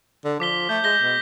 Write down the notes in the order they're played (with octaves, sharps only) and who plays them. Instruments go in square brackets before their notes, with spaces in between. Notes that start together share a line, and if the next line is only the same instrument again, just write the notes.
[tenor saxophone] D3
[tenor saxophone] F3 [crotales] D6 B6 G7
[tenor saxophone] A3 [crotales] G6
[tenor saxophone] G#3 [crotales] G6 A#6 G7
[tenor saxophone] B2